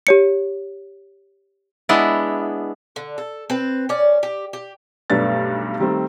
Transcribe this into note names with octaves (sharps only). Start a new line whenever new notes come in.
G4 C#5 C#7
G#3 B3 D4 E4
D3
A4
C4 B4
C#4 D5
G4
G4
B1 G2 A3 D4 B4 A6
D#3 G3 A3 C4